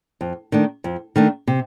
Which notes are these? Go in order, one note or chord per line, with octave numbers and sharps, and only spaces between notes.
F2
D#3 A3 D4
F2
D#3 A3 D4
C3